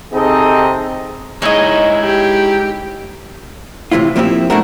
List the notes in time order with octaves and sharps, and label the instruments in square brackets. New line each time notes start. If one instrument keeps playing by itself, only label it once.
[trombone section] C3 C4 G#4 [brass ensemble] D#4 A4 D#5
[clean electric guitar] G#3 D#4 E4 [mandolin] C#5 D#5
[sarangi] G4
[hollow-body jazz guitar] A2 C3 E3 E4 F4
F3 A#3 C4 D#4 E4 G4
A3 A#3 D4 E4 F#4 A#4